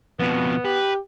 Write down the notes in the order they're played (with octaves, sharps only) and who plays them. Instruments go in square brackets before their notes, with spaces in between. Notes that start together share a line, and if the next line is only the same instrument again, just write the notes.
[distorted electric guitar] F2 B2 [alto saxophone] B3
[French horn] G4 [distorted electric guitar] B4